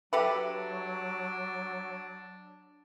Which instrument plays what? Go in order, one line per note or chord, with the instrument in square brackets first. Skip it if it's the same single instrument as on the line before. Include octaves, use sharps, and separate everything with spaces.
[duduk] F#3 [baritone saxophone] D4 [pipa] G4 A4 B4 [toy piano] E5